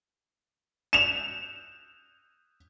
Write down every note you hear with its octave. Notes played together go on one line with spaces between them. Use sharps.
E7 F7